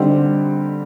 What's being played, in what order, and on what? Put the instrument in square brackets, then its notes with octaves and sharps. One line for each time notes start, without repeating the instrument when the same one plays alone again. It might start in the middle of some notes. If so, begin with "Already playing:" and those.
Already playing: [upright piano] D3 G3 C4 D#4 G4